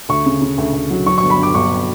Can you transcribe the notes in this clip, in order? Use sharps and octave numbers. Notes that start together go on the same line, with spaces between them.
D2 C#6
C#3
C#3
D2
D2
F#3
F#3 C#6
C#6
G1
B5
G2 D6
G1 C#6